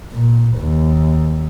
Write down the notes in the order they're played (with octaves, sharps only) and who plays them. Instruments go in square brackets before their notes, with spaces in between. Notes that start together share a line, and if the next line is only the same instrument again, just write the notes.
[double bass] A#2
D#2